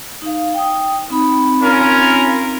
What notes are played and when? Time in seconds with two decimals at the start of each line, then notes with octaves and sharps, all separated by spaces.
0.22 D#4 F5
0.54 G5 D#6
1.10 C4 D#4 B5
1.63 C#4 F4 A#4